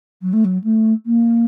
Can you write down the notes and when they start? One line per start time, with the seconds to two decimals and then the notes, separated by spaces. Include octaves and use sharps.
0.22 F#3
0.33 A3
0.45 F#3
0.64 A3
1.06 A#3